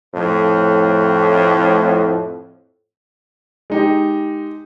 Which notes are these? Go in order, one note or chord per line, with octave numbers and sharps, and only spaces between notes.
F2 A2
G#3 D#4 G4